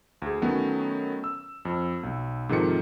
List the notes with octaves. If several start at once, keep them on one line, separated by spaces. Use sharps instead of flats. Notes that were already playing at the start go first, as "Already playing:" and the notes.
D2 G#4
D#3 F#3 A3 B3 C#4
E6
F2
B1
G#2 C3 D#3 F3 A4 C#7